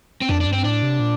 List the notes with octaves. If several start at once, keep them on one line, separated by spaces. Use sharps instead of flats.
C4
F2 D4
D4
G2
C4
A2 D4
C3
A#2